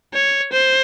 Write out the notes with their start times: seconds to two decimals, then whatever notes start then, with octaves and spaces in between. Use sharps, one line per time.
0.14 C#5
0.53 C5